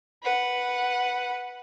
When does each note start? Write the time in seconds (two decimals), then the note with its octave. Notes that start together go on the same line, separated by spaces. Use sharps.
0.23 B4 F#5